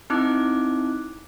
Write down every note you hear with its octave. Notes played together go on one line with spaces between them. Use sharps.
C4 D#4 E4 D6 F#6